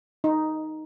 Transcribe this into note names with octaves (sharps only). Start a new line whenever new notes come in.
D#4